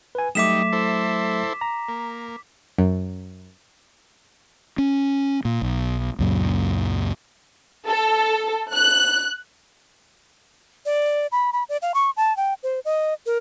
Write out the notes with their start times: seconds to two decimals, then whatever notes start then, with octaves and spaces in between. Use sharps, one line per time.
0.15 B4 G#5
0.35 F#3 G3 A3 D#4 E5 D6 B6 E7
0.73 E4 A4 C5
1.61 A#5
1.89 A#3
2.79 F#2
4.78 C#4
5.45 A#2
5.62 B1
6.19 C#2 F#2 A#2
7.86 A4
8.73 F#6
10.85 D5
11.32 B5
11.53 B5
11.69 D5
11.82 F5
11.94 C#6
12.17 A5
12.37 G5
12.63 C5
12.85 D#5
13.26 A#4